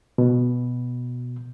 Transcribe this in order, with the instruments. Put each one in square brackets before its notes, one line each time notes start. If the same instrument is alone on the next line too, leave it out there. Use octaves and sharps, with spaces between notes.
[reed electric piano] B2